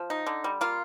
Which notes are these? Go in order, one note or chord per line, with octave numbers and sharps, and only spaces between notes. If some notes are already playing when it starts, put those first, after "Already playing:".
Already playing: F3
D#4
D3
G3
A#3 F4